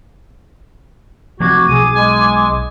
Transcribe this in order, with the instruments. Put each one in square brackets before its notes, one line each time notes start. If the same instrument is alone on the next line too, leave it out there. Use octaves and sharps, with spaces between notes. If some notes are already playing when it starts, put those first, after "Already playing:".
[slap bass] F3 A3 C4 [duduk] F#4 [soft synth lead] D6 [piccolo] G#6
[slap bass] B1 [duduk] G#4 [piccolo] D#7
[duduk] G#3 [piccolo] G#5